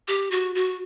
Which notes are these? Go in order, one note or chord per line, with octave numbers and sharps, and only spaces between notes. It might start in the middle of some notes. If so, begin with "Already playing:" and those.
G4
F#4
F#4